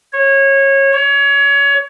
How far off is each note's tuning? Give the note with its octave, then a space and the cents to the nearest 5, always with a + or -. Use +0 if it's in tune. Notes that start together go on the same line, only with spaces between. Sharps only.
C#5 -20
C#5 +25